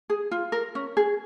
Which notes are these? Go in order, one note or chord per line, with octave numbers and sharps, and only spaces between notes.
G#4
F4
A#4
C#4
G#4